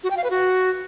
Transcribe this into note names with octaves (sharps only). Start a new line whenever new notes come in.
F#4
G5
F5
B4
F#4